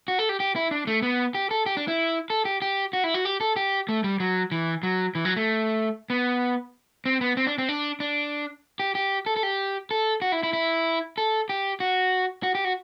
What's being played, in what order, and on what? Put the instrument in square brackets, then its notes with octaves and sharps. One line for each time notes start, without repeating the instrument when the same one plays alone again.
[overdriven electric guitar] F#4
A4
G4
G4
E4
D4
A3
B3
G4
A4
G4
D4
E4
A4
G4
G4
F#4
E4
F#4
G4
A4
G4
A3
G3
F#3
E3
F#3
E3
F#3
A3
B3
C4
B3
C4
D4
C4
D4
D4
G4
G4
A4
A4
G4
A4
F#4
E4
E4
E4
A4
G4
F#4
F#4
G4
F#4